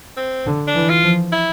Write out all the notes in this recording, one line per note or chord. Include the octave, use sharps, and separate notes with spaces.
C4
D3
D4
E3
F4
F3
E4